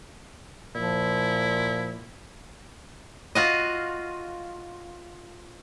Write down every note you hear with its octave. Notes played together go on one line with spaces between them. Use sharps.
A#2 F3 E4
F4 F#4 D#5